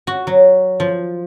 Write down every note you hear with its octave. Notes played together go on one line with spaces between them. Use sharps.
F#4
F#3
F3